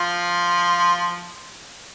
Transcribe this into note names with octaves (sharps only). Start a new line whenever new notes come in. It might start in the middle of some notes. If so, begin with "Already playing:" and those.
Already playing: F3 F4